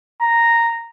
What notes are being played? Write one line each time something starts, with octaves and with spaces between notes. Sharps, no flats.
A#5